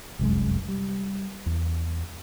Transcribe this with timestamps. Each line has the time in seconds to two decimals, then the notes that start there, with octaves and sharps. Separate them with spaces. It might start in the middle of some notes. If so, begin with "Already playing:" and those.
0.19 F1 C2 F#2 G#3
0.68 G3
1.46 E2